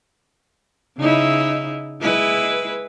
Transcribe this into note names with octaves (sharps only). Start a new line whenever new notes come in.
C#3 D#4 E4
G#3 E4 B4